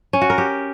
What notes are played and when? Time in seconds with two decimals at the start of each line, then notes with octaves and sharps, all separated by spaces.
0.13 C#4
0.22 F#4
0.30 A#4
0.38 G4